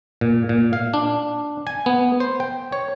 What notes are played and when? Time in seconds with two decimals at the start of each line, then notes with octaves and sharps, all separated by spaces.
0.21 A#2
0.49 A#2
0.73 F5
0.94 D4
1.67 G#5
1.86 B3
2.20 C5
2.40 G5
2.72 C#5